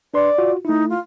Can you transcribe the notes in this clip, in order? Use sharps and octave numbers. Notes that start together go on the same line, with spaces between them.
D4 B4 D5 C6
F4 F#4
A3 D#4 E4
F4